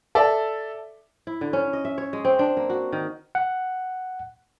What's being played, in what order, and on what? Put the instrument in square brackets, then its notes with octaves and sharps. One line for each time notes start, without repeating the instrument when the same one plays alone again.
[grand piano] A4 D5 E5
[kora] E4
D3
C#4
D#5
E5
C#5
G#3
C4
D4
A#3
F#4
D#3
[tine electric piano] F#5